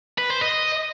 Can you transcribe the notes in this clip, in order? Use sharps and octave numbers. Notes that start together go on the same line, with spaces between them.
B4
C5
D#5